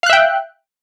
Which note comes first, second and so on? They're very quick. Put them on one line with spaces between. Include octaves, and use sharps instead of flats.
F5 F#6 E5 G5